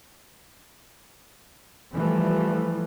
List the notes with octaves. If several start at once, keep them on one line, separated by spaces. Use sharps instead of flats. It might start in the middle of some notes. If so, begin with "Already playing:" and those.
E3 F3 G3 A3